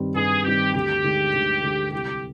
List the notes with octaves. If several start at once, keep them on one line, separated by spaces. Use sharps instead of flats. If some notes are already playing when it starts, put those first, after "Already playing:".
Already playing: G2 D#3 G3 C4
G2 G#4
D#3 G3 C4 G4
D2 G4
D3 G#3 D#4
D2
D3 G#3 D#4
C2 G4